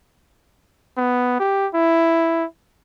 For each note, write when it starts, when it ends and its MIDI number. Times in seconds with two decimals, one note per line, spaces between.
0.97 1.35 59
1.40 1.67 67
1.74 2.45 64